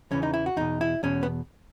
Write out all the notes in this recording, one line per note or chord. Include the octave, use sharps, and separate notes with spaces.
E2 C#3 E3 C#4
D#4
E4
F#4
E2 B2 D#4
E4
E2 B2 C#4
B3